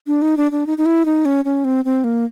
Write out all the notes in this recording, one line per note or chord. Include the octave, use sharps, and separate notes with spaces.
D4
D#4
D4
D4
D#4
D#4
E4
D#4
C#4
C#4
C4
C4
A#3